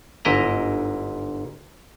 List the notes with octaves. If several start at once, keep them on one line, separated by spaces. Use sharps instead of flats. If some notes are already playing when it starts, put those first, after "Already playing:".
G1 G#2 E4 D#5 A#5